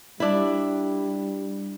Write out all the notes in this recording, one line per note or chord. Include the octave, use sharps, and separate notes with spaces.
G3 D4 E4